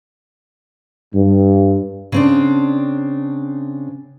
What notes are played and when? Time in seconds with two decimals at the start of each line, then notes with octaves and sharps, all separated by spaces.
1.14 G2
2.12 C#3 C4 D4